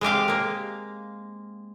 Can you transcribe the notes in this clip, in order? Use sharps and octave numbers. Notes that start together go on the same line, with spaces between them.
G#3 C4 G4 F5
G#3 A#3